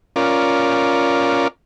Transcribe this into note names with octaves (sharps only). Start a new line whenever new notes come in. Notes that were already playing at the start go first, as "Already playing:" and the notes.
C#4 F4 A#4 D5